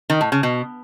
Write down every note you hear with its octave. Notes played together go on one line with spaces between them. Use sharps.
D#3
A2
C#3
B2